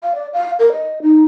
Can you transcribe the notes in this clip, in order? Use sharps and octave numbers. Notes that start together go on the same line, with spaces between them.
F5
D5
F5
A#4
D#5
D#4